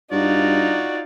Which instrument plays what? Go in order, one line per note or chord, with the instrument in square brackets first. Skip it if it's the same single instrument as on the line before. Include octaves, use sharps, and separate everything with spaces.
[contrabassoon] G2 [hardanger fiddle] D#4 F4 [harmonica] F#4 D5